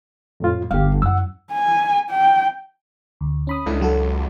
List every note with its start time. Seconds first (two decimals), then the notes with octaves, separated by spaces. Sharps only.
0.40 F2 A2 F4
0.71 G1 G4 F5
1.02 F#2 E3 F#5 E6
1.52 G#5
2.11 G5
3.21 D2
3.47 C#4 B5 D#6
3.66 C#2 D4 E4 A4
3.81 F#3 F#4 A4